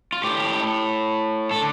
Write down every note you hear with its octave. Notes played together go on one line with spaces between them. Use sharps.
F4
A2 G4
A4
D3